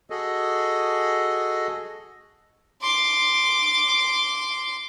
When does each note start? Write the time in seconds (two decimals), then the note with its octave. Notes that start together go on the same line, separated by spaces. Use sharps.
0.10 F#4 G#4 A4 D#5
2.82 C6 D6